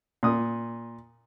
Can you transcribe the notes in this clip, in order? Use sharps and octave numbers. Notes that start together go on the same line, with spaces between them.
A#2 D#6